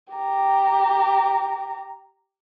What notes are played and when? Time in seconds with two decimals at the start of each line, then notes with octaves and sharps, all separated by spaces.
0.13 G4 A#5